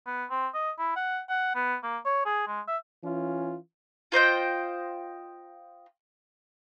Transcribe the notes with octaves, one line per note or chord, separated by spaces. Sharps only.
B3
C4
D#5
E4
F#5
F#5
B3
A#3
C#5
G#4
G#3
E5
E3 C#4 F4
F4 C5 D#5 G5